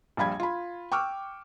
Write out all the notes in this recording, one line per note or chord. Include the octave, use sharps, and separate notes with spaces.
A#1 G3 F5 B5 G#6
F4 B5
G5 C#6 D6 E6 F6